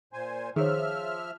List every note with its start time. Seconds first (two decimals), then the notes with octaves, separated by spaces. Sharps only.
0.13 A#2 C5 G#5
0.56 D#3 F3 G#4 C#5 E5 F6